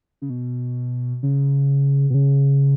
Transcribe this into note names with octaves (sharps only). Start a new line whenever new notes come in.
C#3
B2
C#3
B2
C#3